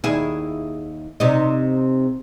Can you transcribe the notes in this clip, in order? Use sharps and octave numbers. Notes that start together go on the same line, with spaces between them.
D#2 E4 G#4
C3 D#4